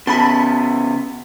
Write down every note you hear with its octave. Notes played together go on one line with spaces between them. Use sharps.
C#3 B3 A5 B5